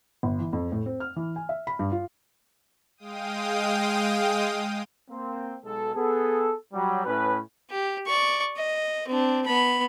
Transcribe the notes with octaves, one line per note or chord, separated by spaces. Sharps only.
G1
E3
F2
A2
C4
F6
E3
G#5
E5
B5
G2
F4
G#3 F5 G5 D#6
A#3 C4
B1 G#3 A4
B3 G#4 A4
F#3 G3
A2 C#4 B4
G4
D5 C#6
D#5
C4 D4
B3 B5